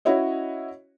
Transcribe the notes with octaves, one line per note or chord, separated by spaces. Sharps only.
C#4 E4 F#4 C#5 D#5